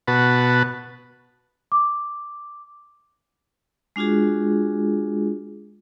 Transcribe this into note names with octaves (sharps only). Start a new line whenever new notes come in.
B2 F#4 B4 A5
D6
G#3 D4 F4 F#4 G#4